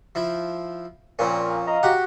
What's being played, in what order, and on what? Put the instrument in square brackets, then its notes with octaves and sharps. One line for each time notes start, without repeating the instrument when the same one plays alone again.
[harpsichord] F3 E4
[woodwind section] A#2 [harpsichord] F3 C4 C#4
[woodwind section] D#5 F5 A#5
[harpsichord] F#4 G4 F#5